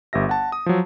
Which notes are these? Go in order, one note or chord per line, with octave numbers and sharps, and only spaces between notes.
G1 G4 E5 A#6
F#5 A5
D#6
F3 F#3